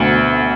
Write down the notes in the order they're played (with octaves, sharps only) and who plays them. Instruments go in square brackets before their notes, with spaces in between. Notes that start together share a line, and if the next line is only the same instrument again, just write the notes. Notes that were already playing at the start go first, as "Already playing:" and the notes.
Already playing: [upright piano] D2 [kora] B2